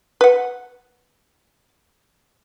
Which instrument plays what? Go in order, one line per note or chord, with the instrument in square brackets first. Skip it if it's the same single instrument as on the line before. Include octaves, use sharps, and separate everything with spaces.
[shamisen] B4 F#5